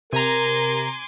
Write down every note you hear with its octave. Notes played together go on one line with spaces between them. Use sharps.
C3 A#4 G#5 A#5 C6 D6